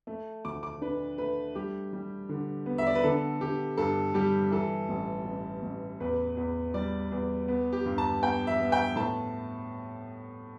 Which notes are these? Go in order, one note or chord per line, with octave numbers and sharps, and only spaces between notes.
A3
D2 D6
D6
D4 B4
A3 B4
G3 G4
G3
D3
B3
E5
D5
B4
D3 A4
D3 G4
G2 A4
G3 G4
E3 A4
A1
A1
A1
E2 B4
E2
G3 D5
E2
B3
G4
G2
A5
B3 G5
E5
B3
G5
A2 A5